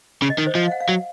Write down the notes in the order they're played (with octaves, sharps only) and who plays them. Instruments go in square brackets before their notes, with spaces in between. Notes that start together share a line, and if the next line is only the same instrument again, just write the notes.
[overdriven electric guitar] C#3
[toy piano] D#5
[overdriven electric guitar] D#3
[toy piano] C5
[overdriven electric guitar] F3 [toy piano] D#5
[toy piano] F5
F#5
F5
[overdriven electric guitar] F#3